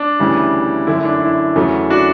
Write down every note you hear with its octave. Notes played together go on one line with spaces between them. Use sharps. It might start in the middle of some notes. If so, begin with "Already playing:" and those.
Already playing: D4
D2 C#3 E3 G3
F#2 D3 A3 E4
D4
E4
E2 C#3 F#3 A3
D4 F#4